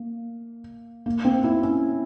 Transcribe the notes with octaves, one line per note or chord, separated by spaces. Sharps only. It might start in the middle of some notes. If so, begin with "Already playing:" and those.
Already playing: A#3
A#3
C4
E4
C#4